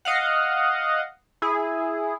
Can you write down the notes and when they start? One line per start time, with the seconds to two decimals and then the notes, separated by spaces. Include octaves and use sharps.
0.05 D#5 F5 F#5
1.42 E4 G#4